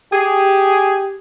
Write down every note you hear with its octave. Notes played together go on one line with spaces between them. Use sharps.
G4 G#4